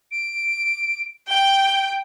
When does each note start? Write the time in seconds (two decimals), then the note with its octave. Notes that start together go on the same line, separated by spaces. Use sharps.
0.11 D7
1.28 G5 G7